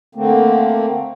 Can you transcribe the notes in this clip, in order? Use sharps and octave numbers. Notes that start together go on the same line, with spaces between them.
D3 A3 A#3 C4